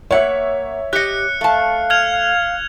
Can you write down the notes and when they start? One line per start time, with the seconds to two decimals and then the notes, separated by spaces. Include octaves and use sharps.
0.11 A#3 C#5 E5 F#5
0.93 G4 D#5 F#6 C#7
1.41 A3 F5 A5
1.90 F6 G#6 F7